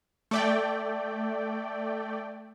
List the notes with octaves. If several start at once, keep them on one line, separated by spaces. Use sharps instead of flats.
A3 D5 G5